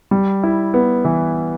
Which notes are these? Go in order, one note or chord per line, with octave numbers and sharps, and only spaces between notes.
G3
E4
B3
E3